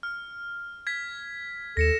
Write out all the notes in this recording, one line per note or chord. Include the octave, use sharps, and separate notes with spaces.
F6
G#6 B6
D#2 A4 A#6 C#7 E7